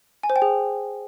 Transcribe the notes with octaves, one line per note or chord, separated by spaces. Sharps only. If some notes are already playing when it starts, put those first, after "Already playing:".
G#5
C5
G5
G#4